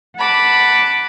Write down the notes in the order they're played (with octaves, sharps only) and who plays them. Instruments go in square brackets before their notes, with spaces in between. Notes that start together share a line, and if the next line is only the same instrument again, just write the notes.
[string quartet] F#5 A5 B5 D6